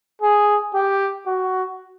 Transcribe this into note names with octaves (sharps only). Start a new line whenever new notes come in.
G#4
G4
F#4